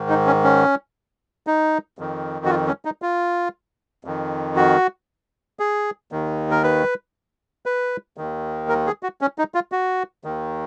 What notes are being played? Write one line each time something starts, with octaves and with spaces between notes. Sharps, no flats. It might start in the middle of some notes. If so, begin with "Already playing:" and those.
Already playing: G#2 D#3
D#4
C#4
C#4
D#4
F2 D#3
F#4
F4
C#4
D#4
F4
F2 D#3
F#4
G#4
D#2 D#3
A#4
B4
B4
D#2 D#3
A#4
G#4
F#4
C#4
D#4
F4
F#4
D#2 D#3